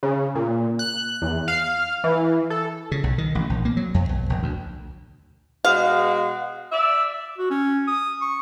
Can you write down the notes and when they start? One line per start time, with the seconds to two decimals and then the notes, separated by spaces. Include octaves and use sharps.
0.03 C#3
0.35 A#2
0.79 F#6
1.22 E2
1.48 F5
2.04 E3
2.50 A4
2.92 C#3
3.03 B1
3.18 D#3
3.35 A1
3.50 A#1
3.65 A#3
3.77 F#3
3.94 F2
4.09 B1
4.30 A#1
4.43 D2
5.65 B2 G#3 F#4 F5
6.72 D5 E5
7.38 F#4
7.51 C#4
7.88 D#6
8.21 C#6